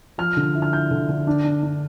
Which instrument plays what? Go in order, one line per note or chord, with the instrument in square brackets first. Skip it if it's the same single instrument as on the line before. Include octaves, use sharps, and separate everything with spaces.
[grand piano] F3 F6
D3
E4
F6
E4 G6
D3
D3
D4
D4
D4